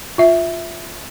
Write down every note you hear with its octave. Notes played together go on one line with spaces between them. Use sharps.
F4 E5